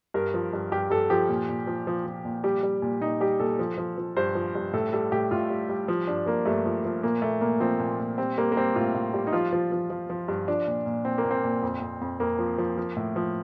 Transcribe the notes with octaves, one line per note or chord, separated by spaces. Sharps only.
G2 A#4
F3
G2
G2 G4
G2 A4
F3 G4
A#2
A#2
F3
F3
F3
A#2
G3 G4
G3
A#2
A#2 D#4
G3 G4
A#2 A4
F3
F3
F3
G2 C5
F3
G2
A2 A4
G3 A4
A2 G4
A2 F4
G3
G3
F3
G2 D4
F3 A#3
G2 A3
F3
F3
A#2 A#3
A#2 A3
A#2 A#3
F3 C4
A#2
A#2
G3 C4
G3 A#3
A#3
G3 C4
A2 F4
A2
G3
D#4
F3 F4
F3
F3
F3
F3
G2
F3 D4
A#2
A#2
A#2 C4
A#3
A#2
C4
A#2
F2
F2
F2
F2 A#3
F3
F3
F3
A2
F3